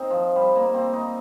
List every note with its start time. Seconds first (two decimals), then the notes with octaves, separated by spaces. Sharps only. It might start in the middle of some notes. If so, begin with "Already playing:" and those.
Already playing: C4 D#4
0.11 F3
0.36 G3
0.55 A#3
0.74 C4
0.93 D#4